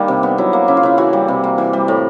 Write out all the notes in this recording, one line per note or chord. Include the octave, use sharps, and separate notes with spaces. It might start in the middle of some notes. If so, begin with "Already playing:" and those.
Already playing: D#3 G3 A#3 D4
C3
B3
F#3 E4
A#3
C#3 E4
F4
C#3 E4
E3 F#4
G3
C3
A#3
E3
G3
A2